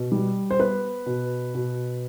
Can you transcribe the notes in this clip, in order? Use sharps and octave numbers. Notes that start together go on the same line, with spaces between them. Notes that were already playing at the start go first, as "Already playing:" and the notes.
Already playing: B2
G3
C5
B3 B4
B2
B2